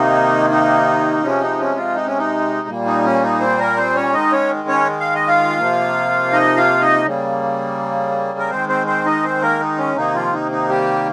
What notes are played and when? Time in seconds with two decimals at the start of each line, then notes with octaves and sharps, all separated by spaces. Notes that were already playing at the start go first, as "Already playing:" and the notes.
Already playing: C3 D#3 A#3 D#4
0.50 D#4
1.22 C3 F3 G#3 C#4
1.41 D#4
1.59 C#4
1.77 F3 F4
1.95 D#4
2.07 C#4
2.18 D#4
2.68 A#2 G3 A#3
2.86 D#4
3.04 C#4
3.23 D#4
3.40 C4 C5
3.59 A#3 A#4
3.77 C4 C5
3.95 C#4 C#5
4.13 D#3 G#3 D#4 D#5
4.32 C#4 C#5
4.68 C#4 C#5
5.00 F5
5.15 D#5
5.27 F4 F5
5.59 C3 F3 A#3
6.33 D#4 D#5
6.57 F4 F5
6.81 D#4 D#5
7.05 C#3 G3 A#3
8.39 A#4
8.50 D#3 G#3 C4 C5
8.69 C4 C5
8.87 C4 C5
9.06 D#4 D#5
9.23 C4 C5
9.42 A#3 A#4
9.60 D#4
9.78 C#4
9.96 C3 D#3 A#3 D#4
10.15 F3 F4
10.33 D#4
10.51 D#4
10.69 G3 G4